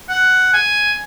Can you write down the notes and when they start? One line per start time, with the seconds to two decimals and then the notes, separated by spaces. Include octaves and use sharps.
0.09 F#5
0.53 G#5